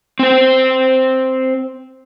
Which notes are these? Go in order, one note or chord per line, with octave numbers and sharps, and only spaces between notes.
C4 C5